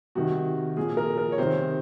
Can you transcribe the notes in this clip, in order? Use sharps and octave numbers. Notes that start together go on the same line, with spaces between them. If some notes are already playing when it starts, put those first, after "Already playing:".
C3 D#3 F#4
A#2 F3 G#4
A#4
A#4
C#5
C3 D#3 C5